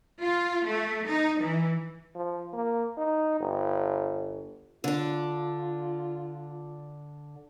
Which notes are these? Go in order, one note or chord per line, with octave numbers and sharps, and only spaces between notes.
F4
A3
D#4
E3
F3
A#3
D#4
G1
D3 D4 F4